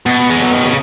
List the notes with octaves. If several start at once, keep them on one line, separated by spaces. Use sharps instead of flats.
B2
G#3
F#3
D#3
C#3